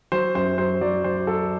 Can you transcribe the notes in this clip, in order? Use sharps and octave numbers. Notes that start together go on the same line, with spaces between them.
F#3 C5
F#2 C5
F#3 C5
F#3 D5
F#3 C5
F#3 A4